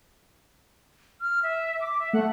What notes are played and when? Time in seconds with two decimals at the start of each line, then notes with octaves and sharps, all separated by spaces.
1.21 F6
1.43 E5
1.81 D6
1.99 E5
2.13 A3 F#5